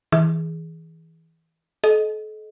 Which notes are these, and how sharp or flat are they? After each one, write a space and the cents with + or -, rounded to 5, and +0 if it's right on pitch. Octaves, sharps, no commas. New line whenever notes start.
E3 -30 G#4 +0
A4 -40 D#5 +0